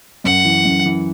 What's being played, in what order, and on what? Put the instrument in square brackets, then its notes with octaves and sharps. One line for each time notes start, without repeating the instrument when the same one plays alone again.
[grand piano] F#2 [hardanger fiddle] F#5
[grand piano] E3
F#2
E3